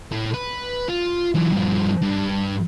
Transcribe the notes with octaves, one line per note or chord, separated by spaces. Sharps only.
A2
B4
F4
E3 F#3
G2 F3
G2